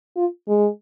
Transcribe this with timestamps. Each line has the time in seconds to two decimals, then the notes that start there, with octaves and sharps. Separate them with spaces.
0.17 F4
0.48 G#3